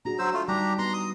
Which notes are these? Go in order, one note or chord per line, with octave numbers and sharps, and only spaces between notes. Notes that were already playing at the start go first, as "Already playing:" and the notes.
D4 F#4 G#4 A#5
F#3 C5 E6
A3 F4
G3 D4 D#4 G4 A#5
B3 B4 A#5 C6
D#6